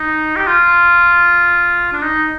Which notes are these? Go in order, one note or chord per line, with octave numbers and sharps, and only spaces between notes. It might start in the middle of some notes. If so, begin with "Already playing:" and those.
Already playing: D#4
G4
F4
D4
D#4